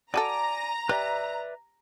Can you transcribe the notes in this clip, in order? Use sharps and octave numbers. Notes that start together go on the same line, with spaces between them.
F#4 G#4 A4 D5 G#5 A#5 D6
G4 B4 D5 E5